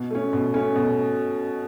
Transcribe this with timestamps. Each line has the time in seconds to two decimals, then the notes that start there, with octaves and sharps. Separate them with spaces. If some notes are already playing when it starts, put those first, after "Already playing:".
Already playing: B2
0.10 A3 C#4
0.33 B2
0.54 A3 C#4
0.75 B2